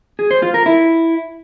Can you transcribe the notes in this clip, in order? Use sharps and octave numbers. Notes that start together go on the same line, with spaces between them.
G#4
C5
F4
A#4
E4